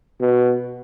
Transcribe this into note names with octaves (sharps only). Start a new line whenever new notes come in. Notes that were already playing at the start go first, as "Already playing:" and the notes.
B2